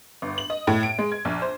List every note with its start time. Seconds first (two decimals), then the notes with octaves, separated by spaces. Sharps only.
0.22 G1
0.38 F#7
0.50 D#5
0.67 A2
0.83 D7
0.99 G#3
1.12 G#6
1.25 A#1
1.42 C5